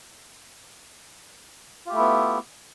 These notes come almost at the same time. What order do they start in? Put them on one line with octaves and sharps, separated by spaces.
F4 G4 A3 E4 B3